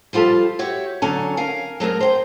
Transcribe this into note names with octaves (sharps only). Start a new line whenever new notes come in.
F3 G3 F4 A4 A5
F#4 G4 C#5 E5
D3 F#3 C#4 G#5 A5
A#4 F5 G#5
F#3 A3 G#4 A#4
C5 G5